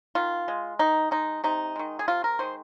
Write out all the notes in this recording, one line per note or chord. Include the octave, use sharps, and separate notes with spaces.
D#3 F4
G#3
D#3 D#4
G#3 D#4
C3 D#4
D#3 G#3
G#4
C3 F4
A#4
D#3 G#3 C5